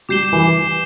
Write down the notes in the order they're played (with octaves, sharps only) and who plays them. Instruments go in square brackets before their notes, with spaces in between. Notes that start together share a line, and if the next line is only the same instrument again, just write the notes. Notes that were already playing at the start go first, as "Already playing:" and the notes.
[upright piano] G3 [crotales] D6 G6 C7 E7 G7
[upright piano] E3